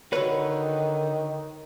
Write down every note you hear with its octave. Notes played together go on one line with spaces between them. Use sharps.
D3 D#3 F#4 B4 C#5